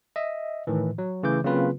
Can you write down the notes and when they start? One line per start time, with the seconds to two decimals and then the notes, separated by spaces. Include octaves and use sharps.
0.16 D#5 E5
0.67 A2 D#3 E3
0.98 F#3
1.23 C#3 E3 A3 D6 G6
1.44 C#3 F#3 A#3 C4 F4 B4